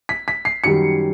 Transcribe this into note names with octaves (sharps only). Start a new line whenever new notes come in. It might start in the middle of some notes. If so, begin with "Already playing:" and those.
B6
B6
C7
F#2 D#3 G3 C#7